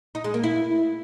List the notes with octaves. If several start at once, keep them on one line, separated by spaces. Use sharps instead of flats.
D#4
G#3
A#3
E4